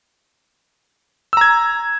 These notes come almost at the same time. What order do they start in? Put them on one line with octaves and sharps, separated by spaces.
E6 A#5 G#6